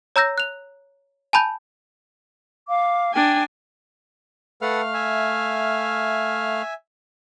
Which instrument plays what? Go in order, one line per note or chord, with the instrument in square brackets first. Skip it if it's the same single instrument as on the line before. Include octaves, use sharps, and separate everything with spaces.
[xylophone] C#5 A#5 E6 G6 A#6
F#6 F7
G#5 A5 B5 G6
[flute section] F5 D6
[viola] D4 G#5 [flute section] G5
[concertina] A3 F5 F6 [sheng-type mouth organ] A4 B4 F#5
[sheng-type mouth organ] E5 G#5